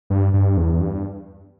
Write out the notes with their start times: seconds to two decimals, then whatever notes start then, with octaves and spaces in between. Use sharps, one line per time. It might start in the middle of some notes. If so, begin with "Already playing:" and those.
0.10 G2
0.33 G2
0.57 E2
0.81 G2